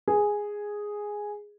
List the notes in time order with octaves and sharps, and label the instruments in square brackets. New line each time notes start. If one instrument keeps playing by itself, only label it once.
[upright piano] G#4